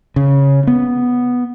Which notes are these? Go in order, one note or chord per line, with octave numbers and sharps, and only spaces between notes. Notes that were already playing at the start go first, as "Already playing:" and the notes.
C#3
B3